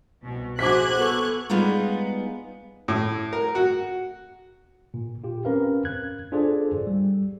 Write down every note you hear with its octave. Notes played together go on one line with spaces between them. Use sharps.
C2 B2
F#4 G#4 C5 D6 F#6 G#6 B6
B3 A4 C#6
G3 G#3 B3 D#4 F4
A2
A#4
F#4
A#2
F4 G4
C4 C#4 A#4 B4 F5
F#6 G#6
D4 F4 G#4 A4 C5 D5
G3